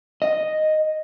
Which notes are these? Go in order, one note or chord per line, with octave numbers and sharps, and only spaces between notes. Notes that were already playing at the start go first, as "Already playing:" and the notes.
D#5